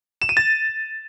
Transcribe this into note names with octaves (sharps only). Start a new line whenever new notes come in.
E7
D#7
A6